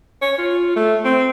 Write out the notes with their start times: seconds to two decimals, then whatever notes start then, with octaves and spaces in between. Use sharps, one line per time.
0.22 C#5
0.38 F4
0.76 A3
1.04 C4